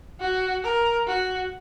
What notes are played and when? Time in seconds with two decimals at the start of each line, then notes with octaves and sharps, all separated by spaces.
0.20 F#4
0.63 A#4
1.07 F#4